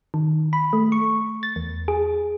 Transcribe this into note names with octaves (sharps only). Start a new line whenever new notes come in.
D#3
B5
A3
C#6
A6
E2
G#4